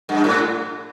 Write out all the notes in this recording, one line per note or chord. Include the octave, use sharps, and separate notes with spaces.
G2
A2